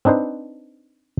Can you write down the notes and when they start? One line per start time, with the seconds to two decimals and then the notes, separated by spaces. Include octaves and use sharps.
0.05 C4 D4 D#4 B4 C5